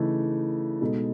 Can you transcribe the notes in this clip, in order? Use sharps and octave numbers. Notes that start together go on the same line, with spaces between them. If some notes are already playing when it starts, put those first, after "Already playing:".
Already playing: C#3 E3 A3 D#4 A4
B2 G#3 D#4 A4